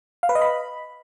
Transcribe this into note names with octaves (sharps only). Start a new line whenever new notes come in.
F5
B4
D#5
B5